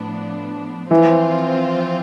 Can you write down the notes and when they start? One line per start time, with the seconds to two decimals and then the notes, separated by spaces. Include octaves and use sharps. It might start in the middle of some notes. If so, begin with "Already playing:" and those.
Already playing: A2 F3 B3 D4
0.90 E3 F3 C4 F4